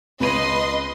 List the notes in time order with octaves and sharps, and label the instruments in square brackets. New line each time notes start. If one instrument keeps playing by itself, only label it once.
[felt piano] C#2 D#7 [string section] B4 D#5 C6